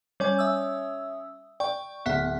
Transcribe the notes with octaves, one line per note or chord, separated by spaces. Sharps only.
G3 C#4 D5 G#5
E5 D#6 E6
D5 G5 C#6
D1 B3 E5 F#5